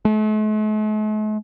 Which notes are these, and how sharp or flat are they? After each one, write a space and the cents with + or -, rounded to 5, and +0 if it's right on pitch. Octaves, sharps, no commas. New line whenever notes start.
A3 -45